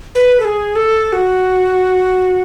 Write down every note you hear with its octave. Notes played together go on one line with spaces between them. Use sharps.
B4
A4
G#4
A4
F#4